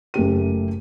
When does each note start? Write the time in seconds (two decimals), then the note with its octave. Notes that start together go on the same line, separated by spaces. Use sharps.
0.14 F#1 A3 G4 D#7